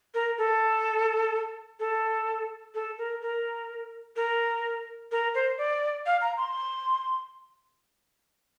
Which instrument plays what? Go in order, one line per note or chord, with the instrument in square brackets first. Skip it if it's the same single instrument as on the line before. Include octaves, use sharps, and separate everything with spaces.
[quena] A#4
A4
A4
A4
A#4
A#4
A#4
A#4
C5
D5
F5
A#5
C6